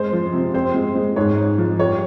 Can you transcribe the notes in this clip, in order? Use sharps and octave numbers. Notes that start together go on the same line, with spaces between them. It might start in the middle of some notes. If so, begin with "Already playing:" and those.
Already playing: G#3 C5
F3
C3
C4 C5
G#3
G#3
G#2 C#5
G#2
F3
G3 C#5